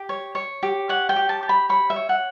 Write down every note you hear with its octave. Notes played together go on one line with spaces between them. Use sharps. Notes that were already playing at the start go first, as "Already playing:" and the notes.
Already playing: G4
C#5
C#5
G4
C#5 F#5
G5
G4
A5
G4
B5
C#5 B5
E5
C#5
F#5